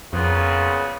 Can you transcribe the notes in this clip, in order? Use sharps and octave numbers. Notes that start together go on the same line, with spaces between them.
F2 A#2 C#3 B3